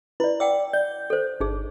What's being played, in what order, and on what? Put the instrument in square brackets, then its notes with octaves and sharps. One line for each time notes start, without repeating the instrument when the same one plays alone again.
[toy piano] E4 D5 [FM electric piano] B4
[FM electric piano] D5 [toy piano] F#5 G5 E6
[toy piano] D5 [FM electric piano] G6
[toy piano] A4 C5
[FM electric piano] G1 [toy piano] D#4 G#4